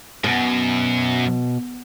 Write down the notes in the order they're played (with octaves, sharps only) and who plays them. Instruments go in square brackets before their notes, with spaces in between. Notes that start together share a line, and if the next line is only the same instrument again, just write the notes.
[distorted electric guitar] F#2 [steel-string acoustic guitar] B2